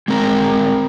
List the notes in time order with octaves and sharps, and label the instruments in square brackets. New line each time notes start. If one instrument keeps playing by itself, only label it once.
[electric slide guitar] G#3 C4 A#4